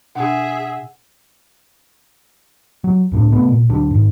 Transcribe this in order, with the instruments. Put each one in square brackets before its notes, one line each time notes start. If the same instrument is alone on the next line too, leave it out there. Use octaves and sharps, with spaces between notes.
[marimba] B2 D4 [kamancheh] G#4 E5 [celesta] F#5
[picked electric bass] F#3
C#2 A2 D4
C3 G#3 A3 B3
A#2
D2 F#3 D4
G#2 D#3